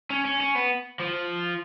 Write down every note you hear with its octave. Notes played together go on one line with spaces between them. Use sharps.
C#4
C#4
C#4
B3
F3